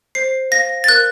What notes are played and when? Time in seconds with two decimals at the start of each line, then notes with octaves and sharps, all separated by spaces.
0.15 C5 C7
0.51 F5 A#6
0.84 A6
0.88 A#4 F#6